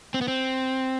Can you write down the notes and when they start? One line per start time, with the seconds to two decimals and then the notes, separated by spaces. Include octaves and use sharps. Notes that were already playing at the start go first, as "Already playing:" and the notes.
0.14 C4
0.21 B3
0.28 C4